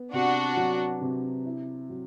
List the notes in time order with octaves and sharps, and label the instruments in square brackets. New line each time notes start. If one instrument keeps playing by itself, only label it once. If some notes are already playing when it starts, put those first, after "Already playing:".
Already playing: [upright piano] B3
[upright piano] C3 [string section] D4 F#4
[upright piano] F#3
C3
E4
F#3